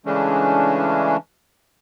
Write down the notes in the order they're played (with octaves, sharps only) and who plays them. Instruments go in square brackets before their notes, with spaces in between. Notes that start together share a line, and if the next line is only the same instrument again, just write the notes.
[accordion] C#3 E3 G#3 A3 C#4 D4